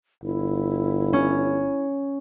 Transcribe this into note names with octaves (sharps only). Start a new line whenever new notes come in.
G1 E4
C#4